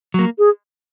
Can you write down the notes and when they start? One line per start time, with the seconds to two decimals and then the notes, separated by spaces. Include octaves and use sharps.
0.14 F#3 A#3
0.38 G#4